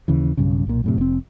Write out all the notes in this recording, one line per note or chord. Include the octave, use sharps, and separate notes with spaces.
D#2 C#3 E3
B1 G2 C#3
B1 A#2
F#2 A2 C3
F1 C4